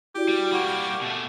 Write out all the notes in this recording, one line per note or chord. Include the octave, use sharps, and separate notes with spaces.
E4 F#4 G4 D5
G3
G3 A#3 F#5 C#6 D6
B2 A3